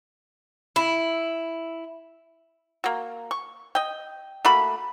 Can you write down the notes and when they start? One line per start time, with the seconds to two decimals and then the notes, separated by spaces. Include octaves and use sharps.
0.76 E4
2.84 A#3 F#4
3.31 C#6
3.75 D#5 G5
4.45 A3 A#3 F#4 B5